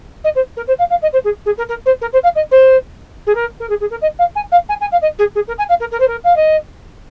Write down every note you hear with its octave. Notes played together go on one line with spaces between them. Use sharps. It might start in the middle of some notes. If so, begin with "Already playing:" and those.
D#5
C5
A#4
C5
F5
F5
D#5
C5
G#4
G#4
A#4
A#4
C5
A#4
C5
F5
D#5
C5
G#4
A#4
A#4
G#4
G#4
A#4
D#5
F5
G#5
F5
G#5
G#5
F5
D#5
G#4
G#4
A#4
G#5
F5
A#4
A#4
C5
A#4
F5
D#5